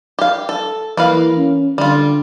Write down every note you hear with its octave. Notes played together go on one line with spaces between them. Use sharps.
G4 F5
A4
E3 A#3 B4 F5
C#4
D3 G3 F4